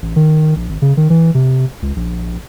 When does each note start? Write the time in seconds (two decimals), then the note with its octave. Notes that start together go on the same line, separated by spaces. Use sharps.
0.02 A1
0.16 D#3
0.56 A#1
0.69 G#1
0.82 C#3
0.97 D#3
1.10 E3
1.34 C3
1.82 C#2
1.96 A#1